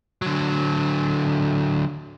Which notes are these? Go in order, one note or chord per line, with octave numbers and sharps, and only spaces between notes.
D3 F#3